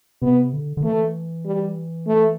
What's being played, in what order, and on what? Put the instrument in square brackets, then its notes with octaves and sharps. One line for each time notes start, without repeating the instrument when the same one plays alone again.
[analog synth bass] C3 [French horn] B3
[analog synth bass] D3
D3
[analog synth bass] E3 [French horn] A3
[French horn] G3
A3